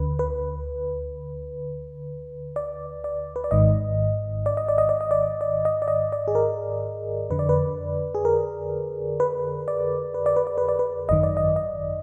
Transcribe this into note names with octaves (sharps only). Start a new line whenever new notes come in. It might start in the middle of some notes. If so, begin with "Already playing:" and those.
Already playing: D2 D3 B4
B4
D5
D5
B4
D5
G#1 G#2 D#3 D#5
D5
D#5
D5
D#5
D5
D#5
D5
D5
D#5
D5
D#5
D5
G#4
A#4
F2 D3 B4
D5
B4
G#4
A#4
B4
D5
B4
D5
B4
D5
B4
D5
B4
G#1 F#2 D#3 D#5
D5
D#5
D#5